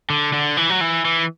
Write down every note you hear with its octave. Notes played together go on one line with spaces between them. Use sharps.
D3
D3
E3
F#3
E3
E3